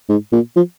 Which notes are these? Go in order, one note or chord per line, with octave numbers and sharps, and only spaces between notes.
G#2
A#2
F3